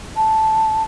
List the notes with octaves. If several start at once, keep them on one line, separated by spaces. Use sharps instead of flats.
A5